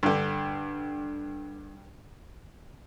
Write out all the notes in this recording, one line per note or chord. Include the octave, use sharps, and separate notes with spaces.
G2 D3